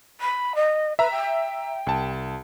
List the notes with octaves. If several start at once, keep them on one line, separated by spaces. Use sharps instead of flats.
B5
D#5
B4 E5 A#5
G5
C2 A5